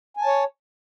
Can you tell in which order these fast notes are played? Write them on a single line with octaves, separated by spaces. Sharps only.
G#5 A5 C#5